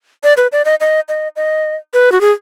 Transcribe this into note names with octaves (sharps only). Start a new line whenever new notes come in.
D5
B4
D5
D#5
D#5
D#5
D#5
B4
F#4
G#4